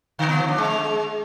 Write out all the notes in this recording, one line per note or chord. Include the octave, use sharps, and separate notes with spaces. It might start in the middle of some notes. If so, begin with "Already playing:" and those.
D3
B3
F3
D4
G#3